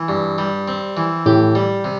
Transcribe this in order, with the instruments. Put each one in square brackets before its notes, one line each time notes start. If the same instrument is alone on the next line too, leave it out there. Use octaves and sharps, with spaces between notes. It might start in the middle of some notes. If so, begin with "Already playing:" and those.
Already playing: [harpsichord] E3
G2
G3
C4
E3
[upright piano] A2 [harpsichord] G4
[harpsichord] G3
C3